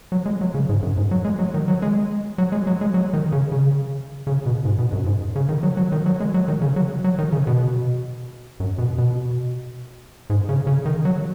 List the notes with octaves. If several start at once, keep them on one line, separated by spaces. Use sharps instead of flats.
F#3
G#3
F#3
C#3
G#2
F#2
G#2
F#3
G#3
F#3
D#3
F#3
G#3
F#3
G#3
F#3
G#3
F#3
D#3
C#3
C#3
C#3
B2
G#2
B2
F#2
G#2
C#3
D#3
F#3
F#3
D#3
F#3
G#3
F#3
D#3
C#3
F#3
F#3
D#3
C#3
B2
F#2
B2
B2
G#2
C#3
C#3
D#3
F#3